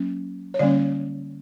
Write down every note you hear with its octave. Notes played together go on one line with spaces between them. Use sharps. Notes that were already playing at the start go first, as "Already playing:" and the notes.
Already playing: F#3 A#3 C#4
C#5
D3 G3 A#3 C#4 D5